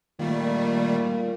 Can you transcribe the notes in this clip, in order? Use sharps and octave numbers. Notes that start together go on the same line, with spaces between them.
A#2 D#3 G3 A3